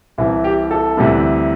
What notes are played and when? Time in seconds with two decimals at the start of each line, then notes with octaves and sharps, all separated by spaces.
0.18 C2 C3 E3
0.44 G4
0.71 A4
0.97 D2 C3 E3 G3